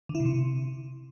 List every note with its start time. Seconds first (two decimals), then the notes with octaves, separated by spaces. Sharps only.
0.09 D3
0.15 E4
0.20 B2
0.25 C3